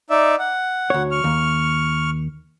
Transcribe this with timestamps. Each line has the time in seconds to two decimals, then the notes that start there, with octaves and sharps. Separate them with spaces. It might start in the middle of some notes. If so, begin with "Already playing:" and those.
0.10 D#4 D5 E5
0.39 F#5
0.90 D2 C#5
1.11 C#6 F6
1.24 D#2